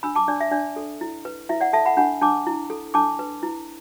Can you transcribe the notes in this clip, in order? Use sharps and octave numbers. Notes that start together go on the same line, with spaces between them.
D4 B5 E6
A5 D6
D4 D5
E5
D4 D5
A4
E4
B4
E4 E5
D5 F#5
A4 E5 A5
F#5 B5
D4 F#5 B5
D4 A5 D6
E4
A4
D4 A5 D6
B4
E4